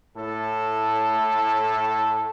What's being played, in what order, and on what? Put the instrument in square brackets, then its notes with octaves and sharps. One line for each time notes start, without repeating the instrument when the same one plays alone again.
[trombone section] A2 A4